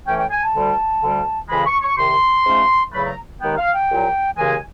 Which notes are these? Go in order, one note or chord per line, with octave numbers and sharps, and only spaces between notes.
A2 E3 A3 C#4 G5
G5
G#5
A5
D2 D3 G3
D2 D3 G3
F2 C#3 E3 G#3 B5
C#6
C#6
C2 C3 D#3 C6
G#2 F3 A3 C#4
E2 C#3 F#3 A3 B5
A#5
D#2 D#3 G#3 B3 D#4 G5
F5
G5
C2 A#2 F#3
D#2 C#3 E3 G#3 G#5